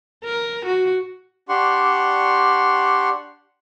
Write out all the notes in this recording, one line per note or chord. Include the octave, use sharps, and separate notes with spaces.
A#4
F#4
D4 G4 F#5 C6 C#6